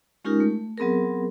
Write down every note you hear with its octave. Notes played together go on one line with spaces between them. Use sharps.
G#3 C#4 D#4 F4 G4 A#4
A3
F#3 B3 C4 G#4 A#4